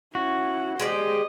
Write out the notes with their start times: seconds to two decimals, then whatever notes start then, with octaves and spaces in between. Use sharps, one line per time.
0.15 C#4 E4 F#4
0.80 G#3 G4 C5 D5 D#5